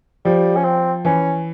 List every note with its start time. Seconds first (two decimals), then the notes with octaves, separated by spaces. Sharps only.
0.25 F3 G3
0.56 C#4
0.65 C4
1.05 E3 C#4